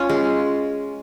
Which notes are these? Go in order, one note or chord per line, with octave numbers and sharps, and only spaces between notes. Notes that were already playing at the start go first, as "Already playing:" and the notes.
Already playing: C#4 F4
G#3